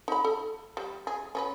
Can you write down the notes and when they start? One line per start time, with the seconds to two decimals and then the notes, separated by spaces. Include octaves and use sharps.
0.08 D#4 B5
0.24 A4
0.77 G3
1.07 G#4
1.35 C#4 G#4 B4